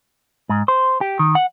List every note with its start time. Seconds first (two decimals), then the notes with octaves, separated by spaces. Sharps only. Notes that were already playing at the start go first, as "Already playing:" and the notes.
0.49 G#2
0.68 C5
1.01 G4
1.19 D#3
1.35 F#5